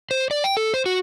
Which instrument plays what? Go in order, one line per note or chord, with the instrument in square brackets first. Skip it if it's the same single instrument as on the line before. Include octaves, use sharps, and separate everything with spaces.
[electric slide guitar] C5
D5
G5
A4
C5
F#4